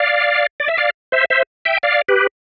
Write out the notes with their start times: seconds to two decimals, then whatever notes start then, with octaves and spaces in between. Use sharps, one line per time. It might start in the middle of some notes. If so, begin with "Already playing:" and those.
Already playing: D5 F5
0.60 D5
0.68 E5
0.77 D5 F5
1.12 C5 E5
1.30 C5 E5
1.65 E5 G5
1.83 D5 F5
2.08 G4 B4